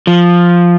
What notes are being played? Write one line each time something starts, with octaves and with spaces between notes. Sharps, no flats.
F3